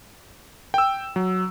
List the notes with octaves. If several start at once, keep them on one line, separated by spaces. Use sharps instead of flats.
G5 E6
F#3